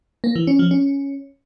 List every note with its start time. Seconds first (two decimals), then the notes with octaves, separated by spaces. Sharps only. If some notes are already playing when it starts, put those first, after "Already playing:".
0.24 A#3
0.36 E3
0.47 C#4
0.59 F3
0.71 C#4